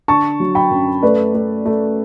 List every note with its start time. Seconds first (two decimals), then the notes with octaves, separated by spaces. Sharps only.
0.08 D3 A5 C#6
0.40 F#3
0.55 G5 B5
0.71 F#2
1.03 A3 B4 D5
1.34 A3
1.65 A3